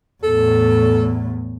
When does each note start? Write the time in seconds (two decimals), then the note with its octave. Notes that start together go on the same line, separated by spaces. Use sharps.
0.23 E2 A2 A4